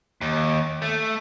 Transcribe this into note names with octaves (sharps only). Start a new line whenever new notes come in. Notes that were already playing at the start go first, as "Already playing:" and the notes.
D#2
A3